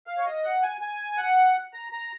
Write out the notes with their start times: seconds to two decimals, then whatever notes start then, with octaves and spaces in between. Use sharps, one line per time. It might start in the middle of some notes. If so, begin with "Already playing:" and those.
0.07 F5
0.18 C#5
0.26 D#5
0.44 F#5
0.63 G#5
0.81 G#5
1.18 F#5
1.74 A#5
1.92 A#5